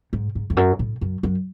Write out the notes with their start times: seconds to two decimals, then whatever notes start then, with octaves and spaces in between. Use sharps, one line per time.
0.13 G#2
0.35 G#2
0.50 F2
0.57 F#2
0.79 A2
1.01 F#2
1.23 F#2